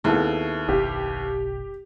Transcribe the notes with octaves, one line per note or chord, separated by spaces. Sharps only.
D#2 B3 C4 E4 G#4 A4
F#1 B1 G4